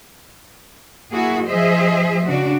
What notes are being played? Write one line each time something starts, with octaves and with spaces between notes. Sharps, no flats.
A#3 E4 F#4 G#4
F3 G#4 C5 D#5 E5
C#3 D4 F#4